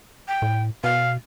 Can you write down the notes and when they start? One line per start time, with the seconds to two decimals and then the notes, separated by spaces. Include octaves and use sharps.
0.28 G5
0.42 A2
0.84 B2 F5